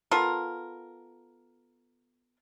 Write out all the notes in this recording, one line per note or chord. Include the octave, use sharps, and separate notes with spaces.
B3 F4 A4 A#4